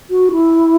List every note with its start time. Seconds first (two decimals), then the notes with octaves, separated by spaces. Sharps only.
0.10 F#4
0.32 E4